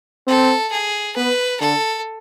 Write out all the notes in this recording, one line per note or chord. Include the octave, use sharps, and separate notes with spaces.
C4 A4
G#4
B3 B4
D3 A4